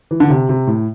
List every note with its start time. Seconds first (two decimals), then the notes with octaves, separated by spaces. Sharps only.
0.11 E3
0.20 D3
0.30 C3
0.49 C3
0.67 A2